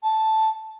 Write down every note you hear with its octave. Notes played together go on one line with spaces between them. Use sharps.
A5